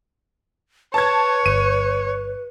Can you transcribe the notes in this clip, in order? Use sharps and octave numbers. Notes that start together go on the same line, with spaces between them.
B4 C#5 A5 G#6
G1 D#7